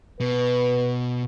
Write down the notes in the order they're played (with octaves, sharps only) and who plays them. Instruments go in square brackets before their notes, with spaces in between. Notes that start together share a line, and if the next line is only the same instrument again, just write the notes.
[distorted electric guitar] B2 [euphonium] B4